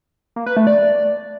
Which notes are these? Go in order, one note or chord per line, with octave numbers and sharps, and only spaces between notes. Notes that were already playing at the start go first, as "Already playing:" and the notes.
A#3
B4
A3
D5